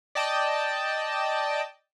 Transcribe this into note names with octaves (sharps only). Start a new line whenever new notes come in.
D5 D#5 G5 A5